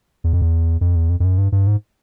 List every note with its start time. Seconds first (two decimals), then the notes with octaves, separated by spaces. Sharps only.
0.24 E2
0.33 F2
0.41 E2
0.81 F2
0.96 E2
1.09 F2
1.20 F2
1.24 F#2
1.38 G2
1.52 G2
1.67 G#2